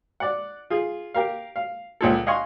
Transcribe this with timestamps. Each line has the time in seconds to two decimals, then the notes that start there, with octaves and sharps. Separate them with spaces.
0.20 D5 F#5
0.70 F4 G#4
1.14 G4 A#4 F5
1.56 F5
2.01 C#2 A#2 A4
2.27 D#5 F5 F#5 G#5 C6 C#6